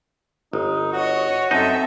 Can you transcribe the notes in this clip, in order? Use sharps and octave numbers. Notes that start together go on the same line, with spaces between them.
G1 D#4
F#4 C#5 D#5
F#2 C4 D#4 A4 E5